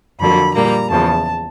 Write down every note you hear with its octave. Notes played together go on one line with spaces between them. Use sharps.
F2 D3 F#3 A#3 B5
A#2 G3 A#3 A#5
E2 C#3 F3 A5